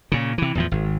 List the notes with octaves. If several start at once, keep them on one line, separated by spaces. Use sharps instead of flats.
A#2 C#3
C3 E3
E2 A2 F3
G#1